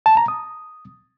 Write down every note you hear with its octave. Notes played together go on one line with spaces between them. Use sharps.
A5
A#5
D#6